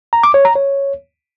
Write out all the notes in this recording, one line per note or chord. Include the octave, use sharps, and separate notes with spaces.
A#5
D6
C#5
A#5
C#5